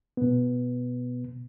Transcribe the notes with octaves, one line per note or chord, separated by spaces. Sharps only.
B2 B3